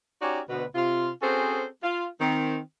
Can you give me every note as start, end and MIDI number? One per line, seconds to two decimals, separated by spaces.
0.22 0.41 61
0.22 0.41 63
0.22 0.41 66
0.22 0.41 67
0.22 0.41 73
0.22 0.41 74
0.49 0.65 38
0.49 0.65 47
0.49 0.65 71
0.75 1.10 48
0.75 1.10 65
1.22 1.66 60
1.22 1.66 61
1.22 1.66 66
1.22 1.66 68
1.22 1.66 69
1.22 1.66 72
1.83 2.07 65
2.21 2.59 51
2.21 2.59 60